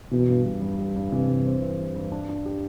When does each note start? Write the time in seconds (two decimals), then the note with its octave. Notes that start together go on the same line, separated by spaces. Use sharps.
0.11 B2 E3
0.28 G2
0.45 G3
0.62 G2
0.79 G3
0.96 G2
1.12 C3 E3
1.29 G2
1.46 C4
1.62 E3
1.79 E3
1.95 G2
2.12 D4
2.29 D4
2.46 G4